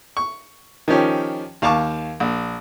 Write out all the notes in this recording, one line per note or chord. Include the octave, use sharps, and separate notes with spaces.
C#6
D#3 F3 C#4 G4
D#2 F5 A5 C#6 D6
A#1